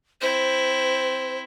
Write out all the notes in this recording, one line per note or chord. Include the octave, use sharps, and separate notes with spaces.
C4 E4 C5